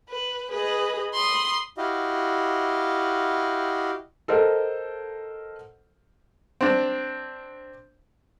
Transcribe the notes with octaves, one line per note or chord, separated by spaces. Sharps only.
B4
G#4 B4 D#5
B5 C6 D#6
E4 F#4 G4 D#5 F5
A4 A#4 C5 D#5 F#5
C4 D4